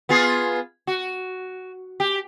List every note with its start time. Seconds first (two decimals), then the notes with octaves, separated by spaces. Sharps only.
0.09 B3 F4 G#4
0.87 F#4
2.00 G4